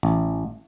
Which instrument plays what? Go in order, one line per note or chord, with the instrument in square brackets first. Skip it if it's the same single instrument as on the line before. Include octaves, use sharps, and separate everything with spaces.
[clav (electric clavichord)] A1